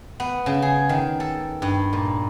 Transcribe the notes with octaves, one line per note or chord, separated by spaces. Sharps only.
B3
C#3
G#4
D#3
A4
G2
A#2